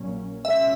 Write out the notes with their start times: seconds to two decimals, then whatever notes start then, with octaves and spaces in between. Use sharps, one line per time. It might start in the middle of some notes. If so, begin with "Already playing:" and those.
Already playing: A#1 A#2 F#3 A#3 C#4
0.44 C#2 B2 G#3 C#4 E5